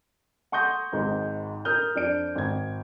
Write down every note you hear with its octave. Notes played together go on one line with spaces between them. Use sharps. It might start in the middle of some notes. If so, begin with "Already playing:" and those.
F#5 C6 C#6 D#6 G6 A#6
G#1 G#2
A#4 A#5 D#6 F6 G6
F2 D4 D7
G#1 G#6